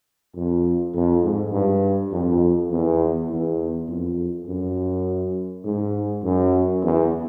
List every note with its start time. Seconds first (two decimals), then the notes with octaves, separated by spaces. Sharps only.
0.35 F2
0.94 F2
1.23 G#2
1.53 G2
2.12 F2
2.71 E2
3.29 E2
3.88 F2
4.47 F#2
5.64 G#2
6.24 F#2
6.83 E2